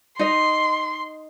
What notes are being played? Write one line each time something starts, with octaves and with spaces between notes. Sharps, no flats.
D#4 D#5 C6